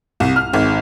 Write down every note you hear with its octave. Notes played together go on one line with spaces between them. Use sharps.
C2
F6
G#1